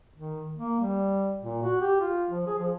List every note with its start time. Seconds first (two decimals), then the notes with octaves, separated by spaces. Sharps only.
0.16 D#3
0.56 A#3
0.80 G3
1.41 A#2
1.63 F#4
1.81 G4
2.00 F4
2.30 F3
2.47 G#4
2.58 F3